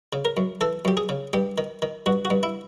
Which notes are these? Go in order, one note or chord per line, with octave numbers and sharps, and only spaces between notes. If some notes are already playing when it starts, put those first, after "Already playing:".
C#3
A#4
F#2
E3 A4
F#2 G4
G#4
C#3
G2 G4
D#3
D#3
G2 F#4
F#4
G2
E4